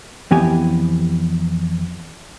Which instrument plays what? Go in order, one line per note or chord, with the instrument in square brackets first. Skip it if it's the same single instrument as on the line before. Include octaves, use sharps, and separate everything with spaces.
[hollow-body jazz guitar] F2 E3 B3 G4 G#5